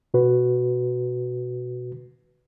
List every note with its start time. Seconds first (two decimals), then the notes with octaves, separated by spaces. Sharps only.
0.14 B2 F#4 B4